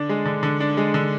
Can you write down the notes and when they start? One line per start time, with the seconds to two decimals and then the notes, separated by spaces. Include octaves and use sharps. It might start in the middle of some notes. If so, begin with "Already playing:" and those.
Already playing: D3 D4
0.09 G#3
0.25 D3
0.43 D3
0.60 D4
0.77 G#3
0.94 D3